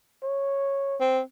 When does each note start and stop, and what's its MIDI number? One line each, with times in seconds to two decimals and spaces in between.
0.23 0.97 73
1.01 1.20 60